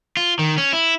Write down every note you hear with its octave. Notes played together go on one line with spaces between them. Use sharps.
F4
D#3
C#4
E4